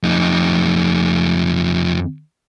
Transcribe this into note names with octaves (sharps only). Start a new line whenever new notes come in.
F2 D#4